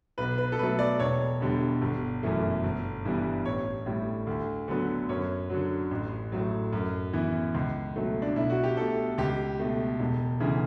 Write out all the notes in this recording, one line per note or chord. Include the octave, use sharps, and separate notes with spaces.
B1 B4
B4
A4
B2 F#3 A3 B4
D5
E1 C#5
E2 D3 G3
G1
F#2 E3 A3
G1
G2 E3 G3 B3
A1 C#5
A2 G3
D2
D3 F#3 B3
F#2 C#5
D3 F#3
A1
A2 F#3
F#2
E3 B3
C#2
B2 F#3 A3
D4
B1 E4
F#4
G4
B2 A3 A4
C#2 G4
B2 A3
E1
D2 C#3 E3